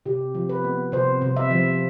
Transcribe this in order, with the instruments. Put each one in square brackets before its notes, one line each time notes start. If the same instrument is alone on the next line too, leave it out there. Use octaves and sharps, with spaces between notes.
[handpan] C3 G4
F3
B4
B3
C3 C5
C3
E5
F3